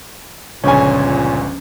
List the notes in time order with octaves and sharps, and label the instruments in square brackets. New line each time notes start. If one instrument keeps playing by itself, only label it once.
[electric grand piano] G1 C#2 [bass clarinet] A#2 [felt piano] C#3 F3 [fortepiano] C#4 G#5